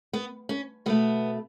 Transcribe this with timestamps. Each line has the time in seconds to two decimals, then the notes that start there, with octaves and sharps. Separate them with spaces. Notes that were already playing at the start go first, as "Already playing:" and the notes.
0.13 B3
0.49 C#4
0.86 B2 A3 B3